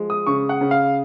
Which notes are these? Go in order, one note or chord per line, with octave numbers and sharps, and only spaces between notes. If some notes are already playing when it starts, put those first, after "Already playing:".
Already playing: F3 G#3
D#6
C#3 C#6
F#5
C#3
F5